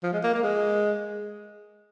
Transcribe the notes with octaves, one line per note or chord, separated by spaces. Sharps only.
F3
G#3
A#3
A#3
G#3